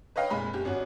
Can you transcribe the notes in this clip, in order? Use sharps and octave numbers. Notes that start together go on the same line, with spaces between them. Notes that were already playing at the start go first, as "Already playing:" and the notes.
B4 C#5 D#5 F5 G5
F1 A#2 G#3 B5
F#1 G4
G#1 C#4 F#4